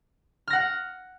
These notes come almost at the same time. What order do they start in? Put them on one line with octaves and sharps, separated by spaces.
F6 A#6 F#5